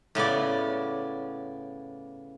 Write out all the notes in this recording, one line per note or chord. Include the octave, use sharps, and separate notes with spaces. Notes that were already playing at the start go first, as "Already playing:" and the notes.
A2 C#3 B3 D5